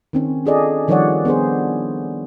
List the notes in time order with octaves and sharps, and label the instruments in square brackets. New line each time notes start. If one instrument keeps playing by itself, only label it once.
[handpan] D#3 C4 C#4
D4 F4 G#4 A4 D5 D#5
D#3 F3 G3 C#5 D5 F#5
B3 D4 G#4 C5